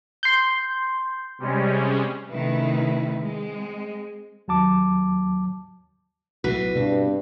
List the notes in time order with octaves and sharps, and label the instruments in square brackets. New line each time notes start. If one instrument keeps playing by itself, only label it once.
[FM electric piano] C6 G6
[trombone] C3 [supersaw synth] G3 G#3 C#4
[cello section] C3 D#3 A3 C#4 E4 B4
G#3 C4
[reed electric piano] D#2 F#3 A5 D6
[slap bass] B1 A2 [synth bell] E4 F#4 [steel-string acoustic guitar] B4
[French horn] G2 [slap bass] B2 C4